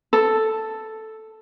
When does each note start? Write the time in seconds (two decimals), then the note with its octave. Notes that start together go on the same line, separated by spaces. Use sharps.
0.13 A4